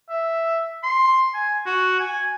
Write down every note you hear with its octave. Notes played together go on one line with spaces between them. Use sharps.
E5
C6
G#5
F#4
G#5